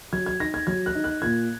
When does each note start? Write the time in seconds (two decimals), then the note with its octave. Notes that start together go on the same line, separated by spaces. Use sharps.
0.13 F#3 G#6
0.26 G#6
0.40 D#4 A#6
0.54 G#6
0.67 F#3 G#6
0.86 F#6
0.95 D#4
1.04 F#6
1.22 A#2 G#6